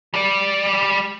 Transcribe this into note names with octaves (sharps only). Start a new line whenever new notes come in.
G3 D5